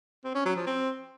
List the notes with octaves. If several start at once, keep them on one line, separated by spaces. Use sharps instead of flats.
C4
C#4
F#3
F3
C4